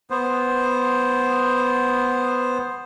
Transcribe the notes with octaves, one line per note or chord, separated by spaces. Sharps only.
B3 C5